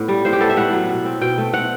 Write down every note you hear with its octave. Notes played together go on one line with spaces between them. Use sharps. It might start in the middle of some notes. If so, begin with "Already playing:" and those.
Already playing: A2 B3
G3
A2 C5
G4
B3 A4
E5
A2 F#5
F#3
B2
C4
B2 G5
A3
C4 F#5